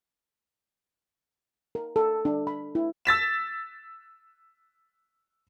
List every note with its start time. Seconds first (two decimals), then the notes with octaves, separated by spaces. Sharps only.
1.75 A#4
1.96 A4
2.25 D4
2.47 B5
2.75 E4
3.05 E6 A6 B6 E7